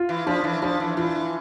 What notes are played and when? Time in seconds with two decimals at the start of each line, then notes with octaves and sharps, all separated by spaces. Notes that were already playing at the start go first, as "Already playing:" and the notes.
Already playing: F4
0.09 E3
0.27 F3 D4
0.44 E3
0.62 F3 D4
0.80 E3
0.97 E3 F4